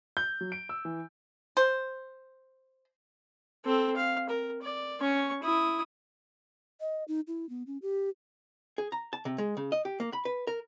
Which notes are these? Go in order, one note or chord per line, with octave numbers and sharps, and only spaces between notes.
G6
F#3
D7
E6
E3
C5
C4 A4
F5
A#4
D5
C#4 C#6
E4 D#6
D#5
D#4
E4
B3
C#4
G4
G#4
A#5
A5
C3
G#3
C#3
D#5
G4
A#3
B5
B4
A#4